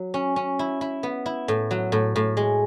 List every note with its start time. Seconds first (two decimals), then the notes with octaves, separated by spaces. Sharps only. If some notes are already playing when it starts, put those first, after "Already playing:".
Already playing: F#3
0.14 C#4
0.36 C#4
0.59 E4
0.81 E4
1.03 B3
1.26 E4
1.48 A2
1.71 F#3
1.92 A2
2.16 A2
2.37 G#3